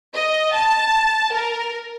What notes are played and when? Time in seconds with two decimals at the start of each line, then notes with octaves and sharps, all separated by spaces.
0.14 D#5
0.54 A5
1.33 A#4